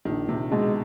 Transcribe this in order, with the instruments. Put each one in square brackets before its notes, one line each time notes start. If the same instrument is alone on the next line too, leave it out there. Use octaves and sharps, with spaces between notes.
[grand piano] A#1 [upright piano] D#3
[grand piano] A#1 [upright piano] C3
[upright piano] B2 [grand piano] G#3